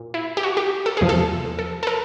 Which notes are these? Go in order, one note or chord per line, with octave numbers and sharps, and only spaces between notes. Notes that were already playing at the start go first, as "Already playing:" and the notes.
Already playing: A#2
E4
G4
F#4
G4
A4
E2 C3 F3 G#4
A4
A4
A4
A#4